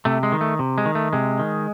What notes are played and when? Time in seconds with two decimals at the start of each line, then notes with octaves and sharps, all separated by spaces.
0.05 C3 A3
0.23 G#3
0.32 D#3
0.41 A3
0.59 C3
0.78 G#3
0.86 D#3
0.95 A3
1.13 C3 G#3
1.39 D#3